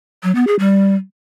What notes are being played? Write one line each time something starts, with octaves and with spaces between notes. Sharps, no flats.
F#3
B3
G#4
G3